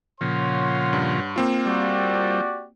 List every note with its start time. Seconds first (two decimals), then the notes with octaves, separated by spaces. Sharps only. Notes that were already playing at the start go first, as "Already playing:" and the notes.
0.21 A#2 C#3 F3 C#5 F#5 C6
0.93 G2
1.36 A#3 C4 F4
1.66 G3 F#4 G4 D5